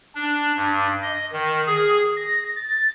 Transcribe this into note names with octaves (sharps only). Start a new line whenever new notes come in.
D4
G2
D#5
D#3
G#4
A#6
A6